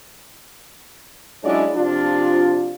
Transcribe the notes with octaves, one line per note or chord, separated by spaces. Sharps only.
F#3 G#3 C#4 D4 E4 D5
C3 F3 D4 F4